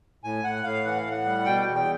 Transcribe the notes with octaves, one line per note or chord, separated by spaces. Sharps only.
A2 G#5
A2 F#5
A2 F5
E3 F#5
F5
A2
F#5
G3
B2 G5
E2
G5